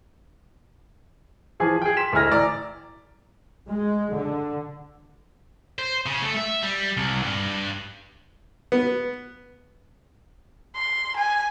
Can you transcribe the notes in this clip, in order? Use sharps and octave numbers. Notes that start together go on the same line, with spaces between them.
E3 F3 G#4 G#5
G#4 G5
C6 B6 E7
D2 G#3 E4 G#5 F6 A#6
A1 D5 A#5
G#3
D3
C5
C#3
A3
E5
G3
C2
G2
B3
C6
G#5